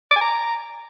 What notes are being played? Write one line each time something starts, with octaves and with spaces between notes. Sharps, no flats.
D6
G#5
A#5